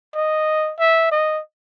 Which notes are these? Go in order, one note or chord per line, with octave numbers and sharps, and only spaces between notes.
D#5
E5
D#5